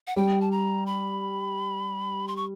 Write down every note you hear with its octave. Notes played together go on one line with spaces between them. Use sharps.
F#5
G3 G5
A5
A#5
B5
C6
C#6